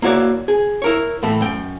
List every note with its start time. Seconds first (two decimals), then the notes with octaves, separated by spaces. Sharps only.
0.02 A#3 E4 F#4 C#5 D5
0.48 G#4
0.82 E4 A#4 C#5
1.23 A2 E3 A3
1.41 F#2 G5